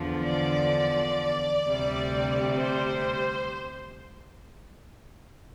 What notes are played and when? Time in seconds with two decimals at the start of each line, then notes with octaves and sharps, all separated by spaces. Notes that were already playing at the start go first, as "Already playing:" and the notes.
Already playing: E2 D3 F3
0.24 D5
1.65 D2 C3 G3
2.59 C5